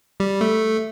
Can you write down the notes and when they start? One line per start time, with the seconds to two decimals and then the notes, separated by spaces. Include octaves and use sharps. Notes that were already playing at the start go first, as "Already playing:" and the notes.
0.20 G3
0.41 A3